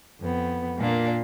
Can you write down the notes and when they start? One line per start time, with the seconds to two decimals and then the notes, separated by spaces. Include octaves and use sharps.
0.21 F2 B3
0.78 A#2 A#3 D4 F4